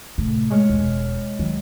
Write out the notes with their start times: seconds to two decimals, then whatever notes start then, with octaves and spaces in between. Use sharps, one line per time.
0.18 A2 C3
0.50 G#3 C#5 F6
0.69 E1 D3
1.39 D#3 F#3